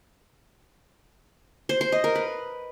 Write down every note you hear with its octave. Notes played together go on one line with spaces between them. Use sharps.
C5
C5
D#5
A#4
B4